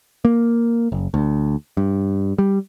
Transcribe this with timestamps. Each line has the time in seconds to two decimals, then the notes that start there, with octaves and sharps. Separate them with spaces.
0.25 A#3
0.92 F#1
1.14 D2
1.77 G2
2.38 G3